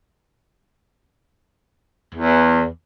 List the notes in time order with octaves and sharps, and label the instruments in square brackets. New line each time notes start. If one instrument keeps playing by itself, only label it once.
[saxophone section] E2